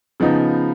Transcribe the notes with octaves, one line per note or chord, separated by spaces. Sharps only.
C#3 F3 B3 D#4